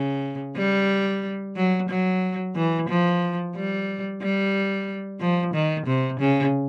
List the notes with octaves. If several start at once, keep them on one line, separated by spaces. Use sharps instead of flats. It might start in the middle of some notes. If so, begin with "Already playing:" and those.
Already playing: C#3
G3
F#3
F#3
E3
F3
G3
G3
F3
D#3
C3
C#3